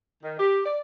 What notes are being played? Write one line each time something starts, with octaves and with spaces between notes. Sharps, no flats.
D#3
G4
D5